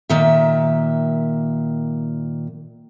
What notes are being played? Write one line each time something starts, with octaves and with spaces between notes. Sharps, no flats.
A#2 D#3 E5